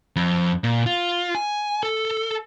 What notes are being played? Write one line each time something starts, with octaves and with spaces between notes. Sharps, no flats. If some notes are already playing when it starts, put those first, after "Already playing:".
F2
A#2
F4
G#5
A4